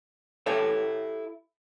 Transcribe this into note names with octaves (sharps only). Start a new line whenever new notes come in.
E4 G4 A4 C#5 E5